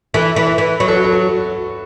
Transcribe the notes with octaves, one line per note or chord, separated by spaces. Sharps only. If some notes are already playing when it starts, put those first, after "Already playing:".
E3 A4
E3
B4
E3
F#3 B4
A4
F#4
A4
F#4